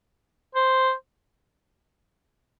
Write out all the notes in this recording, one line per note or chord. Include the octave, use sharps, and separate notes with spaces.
C5